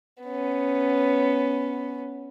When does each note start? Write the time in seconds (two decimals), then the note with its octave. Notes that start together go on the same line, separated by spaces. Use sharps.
0.23 B3 C#4